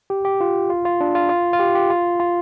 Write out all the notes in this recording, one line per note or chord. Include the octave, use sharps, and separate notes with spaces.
G4
G4
F4
F4
F4
D4
F4
F4
F4
G4
G4
F4
F4